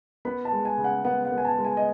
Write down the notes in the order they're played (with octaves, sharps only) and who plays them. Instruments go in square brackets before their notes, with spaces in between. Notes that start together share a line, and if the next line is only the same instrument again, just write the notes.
[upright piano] B3 [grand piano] B5
[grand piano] A5
[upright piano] G#3
[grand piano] G#5
[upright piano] C#3
[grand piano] F#5
[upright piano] B3 [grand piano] F#5
[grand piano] F#5
[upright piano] B3
[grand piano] G#5
A5
[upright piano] G#3
[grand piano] G#5
D#5